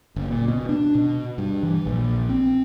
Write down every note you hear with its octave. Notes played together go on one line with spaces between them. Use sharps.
F#1
A#2
B2
D4
B2
G2
E3
A#1
C4